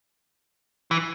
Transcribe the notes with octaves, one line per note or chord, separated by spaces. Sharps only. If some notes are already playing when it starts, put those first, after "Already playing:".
E3